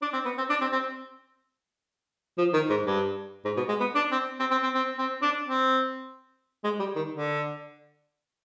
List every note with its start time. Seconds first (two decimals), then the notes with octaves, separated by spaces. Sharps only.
0.02 D4
0.13 C4
0.25 B3
0.38 C4
0.50 D4
0.61 C4
0.73 C4
2.38 F3
2.54 D#3
2.70 G#2
2.86 G2
3.45 G#2
3.57 B2
3.69 G#3
3.80 B3
3.96 D4
4.12 C4
4.40 C4
4.51 C4
4.63 C4
4.75 C4
4.99 C4
5.22 D4
5.46 C4
6.64 G#3
6.80 G3
6.96 D#3
7.12 D3